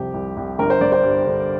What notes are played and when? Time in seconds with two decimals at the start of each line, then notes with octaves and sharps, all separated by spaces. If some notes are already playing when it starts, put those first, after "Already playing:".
Already playing: C2 F2 C3 G4
0.14 C2
0.37 C2
0.59 G1 A#4
0.70 C5
0.81 G1 D5
0.92 C5
1.03 G2
1.25 D3